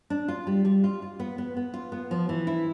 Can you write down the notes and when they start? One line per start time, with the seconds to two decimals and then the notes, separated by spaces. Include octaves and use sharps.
0.10 D4
0.28 F4
0.47 G3
0.65 G3
0.84 F4
1.02 F4
1.20 B3
1.38 B3
1.57 B3
1.74 F4
1.92 B3
2.11 F3
2.29 E3
2.47 E4